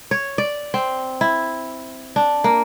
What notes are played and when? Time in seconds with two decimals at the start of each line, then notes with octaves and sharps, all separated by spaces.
0.11 C#5
0.38 D5
0.74 C4
1.21 E4
2.16 D4
2.44 A#3